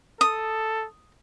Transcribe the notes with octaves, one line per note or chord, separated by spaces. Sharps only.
A4 D#6